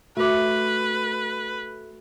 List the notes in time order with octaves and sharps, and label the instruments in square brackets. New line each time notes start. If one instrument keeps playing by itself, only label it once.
[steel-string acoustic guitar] A3 [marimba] F#4 D6 [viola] B4